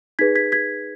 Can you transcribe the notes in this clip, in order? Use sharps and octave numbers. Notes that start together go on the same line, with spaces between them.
D#4 G#4 B4 G#6 B6
G#6 B6
G#6 B6